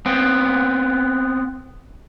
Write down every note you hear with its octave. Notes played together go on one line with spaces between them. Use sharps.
B3 C4